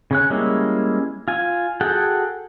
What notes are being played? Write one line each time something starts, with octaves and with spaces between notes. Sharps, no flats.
C#3 C#4 F#6
G3 G#3 A#3 C#4 E4
F4 G#5
F#4 G#4 A4 F#5 G5